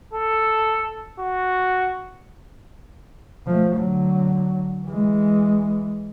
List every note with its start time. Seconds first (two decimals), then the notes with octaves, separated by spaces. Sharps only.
0.13 A4
1.20 F#4
3.47 F3 A3
3.76 D3 F#3
4.86 E3 G#3